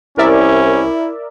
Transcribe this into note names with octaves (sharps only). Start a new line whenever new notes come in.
C2 C#4 E4 A#4 D5 E5